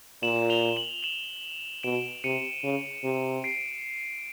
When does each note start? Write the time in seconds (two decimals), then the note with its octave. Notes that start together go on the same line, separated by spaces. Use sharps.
0.22 A#2 E7 F#7
0.50 F7 G7
0.76 E7 F#7
1.03 E7 F#7
1.83 B2 D7 E7
2.24 C3 C#7 D#7
2.64 C#3
3.04 C3
3.44 C7 D7